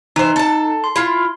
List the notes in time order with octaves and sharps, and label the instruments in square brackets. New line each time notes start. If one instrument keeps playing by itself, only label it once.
[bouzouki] E3 C5 [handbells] D#4
[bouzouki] A4 A5
[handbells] C6
[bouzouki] E4 F4